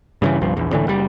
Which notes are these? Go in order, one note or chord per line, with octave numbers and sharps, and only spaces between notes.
G2 C#3 E3
G1 C2 G2 F3
A#1 E2
C#2 A2 D3 E3
F#1 G3